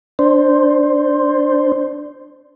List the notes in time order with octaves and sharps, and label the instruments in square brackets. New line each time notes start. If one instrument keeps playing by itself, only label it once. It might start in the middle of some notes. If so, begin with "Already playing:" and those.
[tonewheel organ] D4 C5